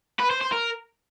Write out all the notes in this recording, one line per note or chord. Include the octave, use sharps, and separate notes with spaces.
B4
C5
C5
A#4